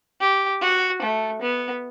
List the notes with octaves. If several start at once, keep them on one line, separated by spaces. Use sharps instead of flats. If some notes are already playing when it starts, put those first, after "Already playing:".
G4
F#4
A3
B3